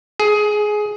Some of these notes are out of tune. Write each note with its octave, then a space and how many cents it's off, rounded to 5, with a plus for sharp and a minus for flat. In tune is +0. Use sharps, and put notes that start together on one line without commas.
G#4 +15